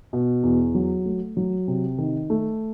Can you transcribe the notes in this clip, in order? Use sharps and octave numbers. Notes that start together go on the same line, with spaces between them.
B2
E2
F#3
A3
F#3
C3
D#3
A3